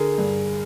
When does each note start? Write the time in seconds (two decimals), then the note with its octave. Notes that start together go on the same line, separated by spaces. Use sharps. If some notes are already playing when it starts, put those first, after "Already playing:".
Already playing: D3 G#4 A#4
0.18 G2